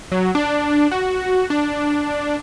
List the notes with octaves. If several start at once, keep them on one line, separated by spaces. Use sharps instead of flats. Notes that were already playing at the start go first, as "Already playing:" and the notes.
F#3
D4
F#4
D4